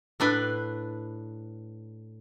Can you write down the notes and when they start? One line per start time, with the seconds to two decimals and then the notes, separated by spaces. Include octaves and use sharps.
0.20 A2 D4 B4